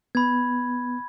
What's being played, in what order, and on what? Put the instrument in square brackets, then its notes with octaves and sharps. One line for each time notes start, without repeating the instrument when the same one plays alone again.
[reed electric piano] B3 [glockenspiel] B5 G#6